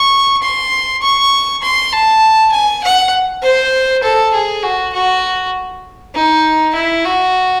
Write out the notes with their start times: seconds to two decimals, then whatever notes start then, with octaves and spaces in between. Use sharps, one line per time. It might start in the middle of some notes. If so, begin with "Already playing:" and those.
Already playing: C#6
0.42 C6
1.01 C#6
1.62 C6
1.92 A5
2.52 G#5
2.83 F#5
3.42 C5
4.03 A4
4.34 G#4
4.62 F#4
4.93 F#4
6.14 D#4
6.74 E4
7.04 F#4